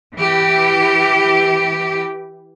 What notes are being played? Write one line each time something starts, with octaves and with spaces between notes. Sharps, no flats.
E3 G4